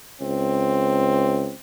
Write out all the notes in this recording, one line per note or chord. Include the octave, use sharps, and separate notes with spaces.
C#2 C4